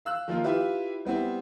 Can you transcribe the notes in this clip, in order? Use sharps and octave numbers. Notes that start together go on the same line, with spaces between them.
F5 E6 F#6
D#3 F3 A#3 F4
E4 F4 G4 B4 E5 F5
G3 B3 C4 E4